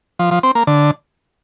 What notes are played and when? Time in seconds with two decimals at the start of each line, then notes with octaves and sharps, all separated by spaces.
0.19 F3
0.31 F3
0.43 C4
0.55 A#3
0.67 D3